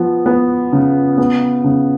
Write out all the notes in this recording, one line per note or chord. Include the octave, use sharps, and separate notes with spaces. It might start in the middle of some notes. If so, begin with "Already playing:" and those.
Already playing: F3 B3
B3
C#3
B3
C#3